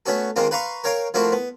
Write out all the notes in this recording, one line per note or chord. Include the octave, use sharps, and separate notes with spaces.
A3 B3 C#4 F#4 A4
D#3 G#3 A#3 C4 F4
B4 F5 A#5 C6 C#6
A#4 C#5 F5 G5 A#5
F3 A3 A#3 C4 E4 F#4
B3